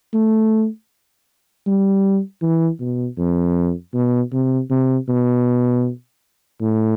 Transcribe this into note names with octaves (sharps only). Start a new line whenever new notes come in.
A3
G3
E3
B2
F2
B2
C3
C3
B2
A2